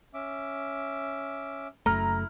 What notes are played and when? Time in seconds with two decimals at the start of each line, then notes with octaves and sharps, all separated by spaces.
0.14 C#4 E5 D6
1.86 F#1 F#2 A3 E4 A#5 F6